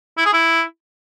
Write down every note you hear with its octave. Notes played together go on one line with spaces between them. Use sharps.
E4
G#4
E4